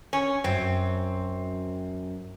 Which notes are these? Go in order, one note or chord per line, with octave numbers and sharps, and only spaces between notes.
C#4
F#2 C4